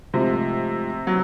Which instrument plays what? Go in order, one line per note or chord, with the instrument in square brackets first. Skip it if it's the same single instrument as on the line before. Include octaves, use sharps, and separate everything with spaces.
[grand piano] G#2 F3 A3 [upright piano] C3
[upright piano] F#3 [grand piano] B3